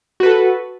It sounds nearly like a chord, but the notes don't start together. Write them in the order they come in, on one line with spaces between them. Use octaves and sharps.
F#4 B4 A4